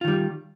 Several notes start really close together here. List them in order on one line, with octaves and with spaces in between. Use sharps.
F4 D#3 G3